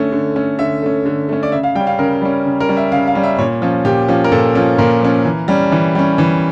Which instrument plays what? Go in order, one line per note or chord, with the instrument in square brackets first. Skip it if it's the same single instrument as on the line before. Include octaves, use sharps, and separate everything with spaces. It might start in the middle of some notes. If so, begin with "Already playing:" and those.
Already playing: [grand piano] D3 A3 C#4
D3
A3 C#4
D3 E5
A3 C#4
D3
A3 C#4
D5
C#3 E5
F5
G3 G5
C#4
F5
C#3 A#4
G3 C#4
C#3
A#4
G3 C#4
E5
C#3 F5
F5
G3 C#4
E5
A#2 C#5
F3 C#4
A#2 G4
F3 C#4
A#4
A#2 A4
F3 C#4
A#2 A#4
F3 C#4
E3
G3 C#4
E3
G3 C#4
E3